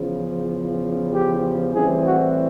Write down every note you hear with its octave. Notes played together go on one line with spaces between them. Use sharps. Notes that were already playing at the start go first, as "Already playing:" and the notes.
Already playing: E2 C#3 F3
G4
A2 E3 G3 C4 G#4
F#4